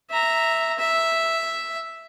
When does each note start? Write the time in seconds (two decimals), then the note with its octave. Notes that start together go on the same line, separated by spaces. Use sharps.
0.10 E5 A#5
0.79 E5